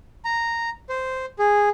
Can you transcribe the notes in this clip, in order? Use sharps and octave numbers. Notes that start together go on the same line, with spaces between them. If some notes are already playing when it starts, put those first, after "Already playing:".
A#5
C5
G#4